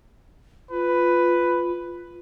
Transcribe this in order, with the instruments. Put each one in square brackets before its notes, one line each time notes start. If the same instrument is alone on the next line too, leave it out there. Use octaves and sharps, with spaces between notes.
[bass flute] F4 [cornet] B4